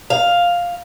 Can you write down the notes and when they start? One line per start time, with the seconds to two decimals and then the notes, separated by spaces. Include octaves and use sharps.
0.10 F5